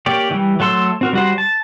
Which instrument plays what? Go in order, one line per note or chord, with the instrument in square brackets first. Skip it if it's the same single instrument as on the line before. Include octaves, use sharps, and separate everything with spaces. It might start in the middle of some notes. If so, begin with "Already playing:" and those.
[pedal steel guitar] A#3 G4 C#5 D5
E3 G3
F#3 A3 A4 C6 E6
C4 F#4 A#4
G3 F#4 C5
A5